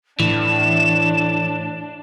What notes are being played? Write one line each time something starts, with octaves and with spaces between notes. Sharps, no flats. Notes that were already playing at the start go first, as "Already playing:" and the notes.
A2 E3 D4 E7